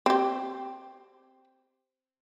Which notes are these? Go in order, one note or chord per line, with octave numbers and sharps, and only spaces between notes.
C4 G4